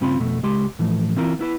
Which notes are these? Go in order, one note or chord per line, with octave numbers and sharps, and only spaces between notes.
G2 C#3 C4 F4 B5 C6
F2 B2 A3
C#2 G#3 G4 C6
A2 E3 F3 A3
E3 C4 E4 F4 A#4
B3 E4 B4